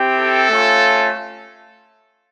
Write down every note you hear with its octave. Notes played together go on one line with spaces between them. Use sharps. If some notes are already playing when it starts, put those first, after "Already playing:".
Already playing: C4 E4 G4
A4
A3 C#4 F4